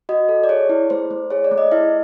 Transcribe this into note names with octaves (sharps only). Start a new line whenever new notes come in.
F#4 D#5
A4
D5
G#4 C#5
E4
A3 C5
A3
G#4 C#5
D5
A3
D#5
E4 E5